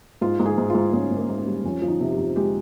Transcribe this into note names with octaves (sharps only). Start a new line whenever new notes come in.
G#2 F4
G#2
G#4
G#2
G#2 F4
G#2 C#4
G#2
A#3
G#2
C#4
G3
F2 C#4
F3
D#4
C3
G4
F2
G#3 G4